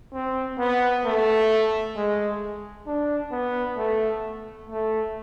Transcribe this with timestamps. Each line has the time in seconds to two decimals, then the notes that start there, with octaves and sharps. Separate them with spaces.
0.13 C4
0.59 B3
1.04 A3
1.96 G#3
2.87 D4
3.32 B3
3.78 A3
4.69 A3